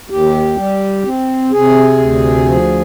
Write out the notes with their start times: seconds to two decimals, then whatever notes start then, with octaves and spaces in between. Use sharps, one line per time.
0.10 D#2 G4
0.56 G3
1.05 C4
1.52 C3 G#4
1.98 D2
2.45 F3